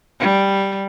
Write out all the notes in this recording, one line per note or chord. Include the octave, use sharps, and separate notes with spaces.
G3